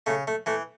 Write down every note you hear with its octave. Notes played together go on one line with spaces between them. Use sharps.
C#3 A3
A3
E3 A3